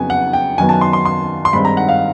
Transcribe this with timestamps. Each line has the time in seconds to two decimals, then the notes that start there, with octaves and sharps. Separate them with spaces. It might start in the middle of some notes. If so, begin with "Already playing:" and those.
Already playing: F2 C#3 F#3 B3 G#5
0.10 F#5
0.33 G5
0.58 F#2 D#3 F#3 B3 G#5
0.69 A5
0.81 C6
0.93 C6
1.05 C6
1.45 C6
1.53 G2 D#3 G#3 C4 B5
1.65 A#5
1.77 F#5
1.89 F5